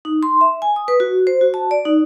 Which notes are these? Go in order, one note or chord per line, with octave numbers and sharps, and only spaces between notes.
D#4
C6
E5
G#5
D#6
B4
F#4
C5
F#4
A5
D5
D#4